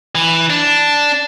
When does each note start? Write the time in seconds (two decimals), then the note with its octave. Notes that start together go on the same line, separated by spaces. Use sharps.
0.15 E3
0.50 D4